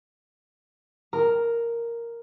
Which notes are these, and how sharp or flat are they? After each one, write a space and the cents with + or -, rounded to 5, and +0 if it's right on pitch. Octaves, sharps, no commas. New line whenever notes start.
A#4 +0 A#5 +0